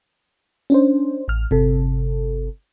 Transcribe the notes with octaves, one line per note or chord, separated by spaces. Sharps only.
C#4 D4 C5
A1 F6
G1 C3 A4